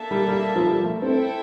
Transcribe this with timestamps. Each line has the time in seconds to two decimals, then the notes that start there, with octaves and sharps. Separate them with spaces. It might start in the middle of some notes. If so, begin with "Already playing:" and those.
Already playing: A#3 D4 A4 E5 A5
0.11 G3
0.28 G3
0.56 F3
0.66 G3
0.84 A3
1.02 C4 E4 A4 E5 G5